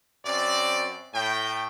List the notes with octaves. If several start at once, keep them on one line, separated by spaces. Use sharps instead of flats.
F#2 C4 D5
A2 G5